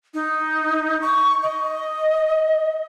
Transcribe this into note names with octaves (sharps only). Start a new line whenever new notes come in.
D#4
C#6
D#5